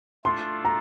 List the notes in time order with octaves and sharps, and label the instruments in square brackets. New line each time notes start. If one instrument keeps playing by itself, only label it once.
[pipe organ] A3 D4 F4 A4 [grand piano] C6
[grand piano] A#5